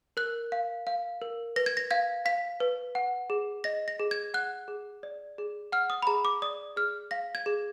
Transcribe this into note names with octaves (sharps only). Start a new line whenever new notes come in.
A#4 F#6
F5
F5
A#4
B4 A#6
G#6
A#6
F5 G#6
F5 B6
B4
F#5
G#4
D#5 A#6
A#6
G#4
G#6
F#5 F#6
G#4
D5
G#4
F#5 F6
D#6
B5
G#4 A#5
D6
D5 D#6
G#4 F6
F5 A#6
G#6
G#4